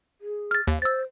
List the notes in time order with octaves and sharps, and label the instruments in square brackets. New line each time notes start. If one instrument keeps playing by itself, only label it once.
[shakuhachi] G#4
[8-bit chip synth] F6 A6
[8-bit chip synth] D#2 [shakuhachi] F5
[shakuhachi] C5 [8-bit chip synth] E6 A6